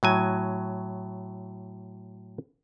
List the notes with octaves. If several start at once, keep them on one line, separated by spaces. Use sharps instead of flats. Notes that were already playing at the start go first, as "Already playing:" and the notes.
A2 F#3 G#5